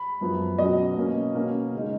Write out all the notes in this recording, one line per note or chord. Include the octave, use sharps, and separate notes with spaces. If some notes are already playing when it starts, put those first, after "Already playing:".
Already playing: B5
F#2 F3 B3
B2 F#3 C#4 D#5
B2 A#3 C#4
B2 A#3 C#4
C#3 G#3 D#4